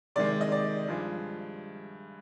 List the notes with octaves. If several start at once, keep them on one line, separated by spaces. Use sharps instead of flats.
C3 D#3 G#3 D5
D#5
D5
G2 F3 G#3